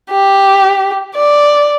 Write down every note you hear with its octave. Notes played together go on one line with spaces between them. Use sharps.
G4
D5